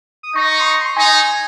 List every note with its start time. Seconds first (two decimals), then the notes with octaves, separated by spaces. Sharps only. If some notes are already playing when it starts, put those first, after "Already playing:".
0.23 D#6
0.35 D#4 C#6
0.51 C#6
0.61 C6
0.66 C#6
0.81 C6
0.97 D#4 G#5